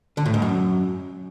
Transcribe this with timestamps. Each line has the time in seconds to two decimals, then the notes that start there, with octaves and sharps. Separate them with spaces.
0.17 D3
0.25 A2
0.34 G#2
0.42 F#2